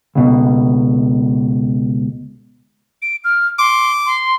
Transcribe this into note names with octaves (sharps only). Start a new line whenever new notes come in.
C#2 B2
D7
F6
C6 D6
C6